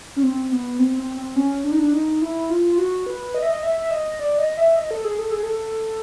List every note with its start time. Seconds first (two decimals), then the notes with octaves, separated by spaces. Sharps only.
0.16 C#4
0.23 C4
0.52 B3
0.79 C4
0.99 C4
1.17 C4
1.36 C#4
1.64 D4
1.72 D#4
1.79 D4
1.93 D#4
2.22 E4
2.50 F4
2.72 F4
2.78 F#4
3.06 B4
3.34 D#5
3.42 E5
3.49 D#5
3.63 E5
3.81 E5
3.91 D#5
4.19 D5
4.38 D#5
4.57 E5
4.76 D#5
4.91 A4
5.04 G#4
5.19 A4
5.31 G#4
5.43 A4